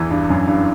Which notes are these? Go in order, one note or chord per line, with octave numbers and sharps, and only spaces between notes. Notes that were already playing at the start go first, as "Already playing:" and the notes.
Already playing: E2 E3
G2
F#2
G2